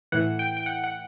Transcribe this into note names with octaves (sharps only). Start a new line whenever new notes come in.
A2 E3 F#5
G5
G5
F#5
F#5